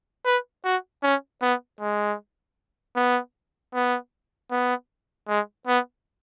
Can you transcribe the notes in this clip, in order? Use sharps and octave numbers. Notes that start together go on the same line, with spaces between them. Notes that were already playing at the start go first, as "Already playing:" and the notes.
B4
F#4
C#4
B3
G#3
B3
B3
B3
G#3
B3